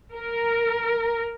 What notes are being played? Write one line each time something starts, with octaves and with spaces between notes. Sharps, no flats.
A#4